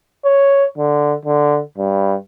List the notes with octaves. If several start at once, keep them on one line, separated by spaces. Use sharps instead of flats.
C#5
D3
D3
G2